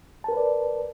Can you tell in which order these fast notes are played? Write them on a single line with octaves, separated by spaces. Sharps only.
A5 A#4 B4 D5